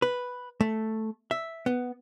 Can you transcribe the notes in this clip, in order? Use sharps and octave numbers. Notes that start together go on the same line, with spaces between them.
B4
A3
E5
B3